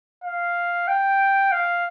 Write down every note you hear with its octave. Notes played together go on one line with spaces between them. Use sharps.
F5
G5
F5